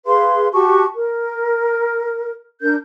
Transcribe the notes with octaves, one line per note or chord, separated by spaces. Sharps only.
G#4 B4 F5 C6
F#4 G4 A5 C#6
A#4
D4 A#4 G6